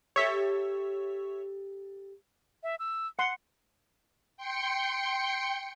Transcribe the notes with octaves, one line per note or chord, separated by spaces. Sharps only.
G4 A4 C#5 E5 B6
E5
E6
F#5 C6 C#7
G5 C6 C#7